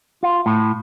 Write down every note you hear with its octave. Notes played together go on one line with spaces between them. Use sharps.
F4
A2